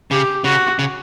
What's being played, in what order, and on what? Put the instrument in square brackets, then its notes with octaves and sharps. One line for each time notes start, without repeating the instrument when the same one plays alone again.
[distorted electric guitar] C#3 [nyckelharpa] G4
[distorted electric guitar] C#3 [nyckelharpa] F#4
[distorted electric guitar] C#3